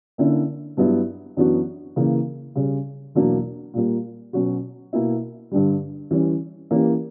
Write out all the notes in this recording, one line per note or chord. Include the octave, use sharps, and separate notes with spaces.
D3 A#3 C#4 E4
G2 F#3 B3 E4
F#2 E3 B3 D4 F#4
C#3 E3 A#3
C#3 G3 C#4
E2 B2 F#3 A#3 D4
A#2 G3 A#3
B2 F#3 C#4 F#4
B2 A#3 E4
G2 D3 G3
E3 G3 C#4
E3 A#3 C#4 G4